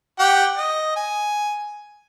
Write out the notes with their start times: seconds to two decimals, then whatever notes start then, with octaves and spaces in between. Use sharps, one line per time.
0.19 G4 F#5 G5
0.57 D#5
0.96 G#5